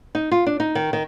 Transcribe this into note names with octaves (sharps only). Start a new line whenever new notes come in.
D#4
F4
D4
D#4
D#3
D#3